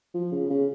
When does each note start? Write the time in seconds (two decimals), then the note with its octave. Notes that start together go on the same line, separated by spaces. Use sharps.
0.14 F3
0.32 C#3
0.50 C#3